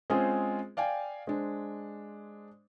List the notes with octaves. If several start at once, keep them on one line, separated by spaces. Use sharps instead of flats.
G#3 C4 C#4 F4 G#4 C5
D5 F5 G5 G#5
G#3 D4 C5